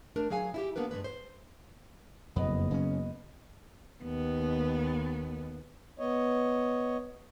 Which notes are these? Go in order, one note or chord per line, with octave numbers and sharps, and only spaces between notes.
A3 D4 A#4
F#3 G#4 F5 G#5
E4 F4 G4
A#3 B3 D4 A#4 B4
G2 F3 G#3 B4
C5
F#1 F2 B3 D#5
C#3 F#3 C#4
D#2 B3
B3 C#5 D#5